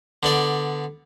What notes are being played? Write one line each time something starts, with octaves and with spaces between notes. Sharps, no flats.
D3 B3 D5